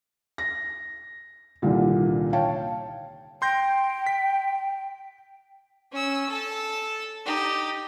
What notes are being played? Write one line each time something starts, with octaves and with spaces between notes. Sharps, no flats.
A#6
C2 A#2 D3 D#3 G3
C#5 F5 G5 A5
G5 C6 G6 A#6
B6
C#4 E6
A4 A5
D#4 G4